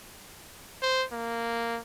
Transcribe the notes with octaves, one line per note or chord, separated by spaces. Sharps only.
C5
A#3